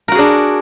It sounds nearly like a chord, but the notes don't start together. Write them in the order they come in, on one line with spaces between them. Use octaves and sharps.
A#4 F#4 G#4 D4